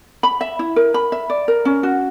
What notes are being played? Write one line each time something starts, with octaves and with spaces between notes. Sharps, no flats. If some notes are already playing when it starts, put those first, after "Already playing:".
B5
E5
E4
A#4
B5
E5
D5
A#4
C#4
F#4